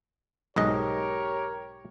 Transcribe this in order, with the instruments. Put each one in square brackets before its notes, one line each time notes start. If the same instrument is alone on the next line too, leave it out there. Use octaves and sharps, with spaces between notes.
[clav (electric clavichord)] B1 G#2 D#5 [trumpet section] G4 A#4 C#5